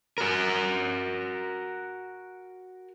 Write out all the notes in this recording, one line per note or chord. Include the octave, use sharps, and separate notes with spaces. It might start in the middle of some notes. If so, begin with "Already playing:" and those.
F#4 A#4